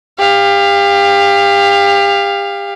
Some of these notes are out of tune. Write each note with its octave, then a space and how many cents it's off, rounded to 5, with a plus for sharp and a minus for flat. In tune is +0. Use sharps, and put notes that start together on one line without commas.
G4 +30 F5 -5